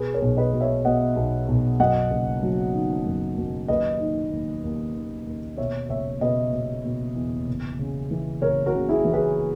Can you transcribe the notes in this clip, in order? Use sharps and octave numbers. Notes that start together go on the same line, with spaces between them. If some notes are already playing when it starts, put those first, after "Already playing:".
Already playing: B2 G#4 B4
A#4 C#5
B1
B4 D#5
B2
C#5 E5
B2 D#5 F#5
B1
B1
F#2 D#5 F#5
F#1
F#3
D#3
F#2
F#2
D#2 B4 D#5
D#3
D#2
D#2
D#3
D#2
B2 C#5 E5
F#1 C#5 E5
B2 B4 D#5
B2
B2
E2
F#1
C#3
E3
F#1 A#4 C#5
F#4 A#4
C#3
E4 G#4
E3
G#4 B4